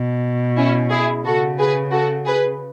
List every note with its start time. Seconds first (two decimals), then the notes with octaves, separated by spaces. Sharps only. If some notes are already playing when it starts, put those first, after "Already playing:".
Already playing: B2
0.57 C#4 E4
0.91 E4 G#4
1.25 C#3 F#4 A4
1.59 G#4 B4
1.92 F#4 A4
2.26 G#4 B4